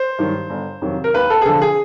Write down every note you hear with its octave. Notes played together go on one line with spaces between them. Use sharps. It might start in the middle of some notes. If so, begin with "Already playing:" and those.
Already playing: C5
G2 D#3 F#3
G1
F2 C3 D#3 F#3
A#4
D#2 B4
A4
G#4
D3 F3 A4
G#4